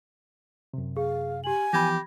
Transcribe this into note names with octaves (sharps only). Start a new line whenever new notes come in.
F#2 C3
G#4 F5
G4 G#5 F#7
E3 F3 B3 G4 B5 G#6 A#6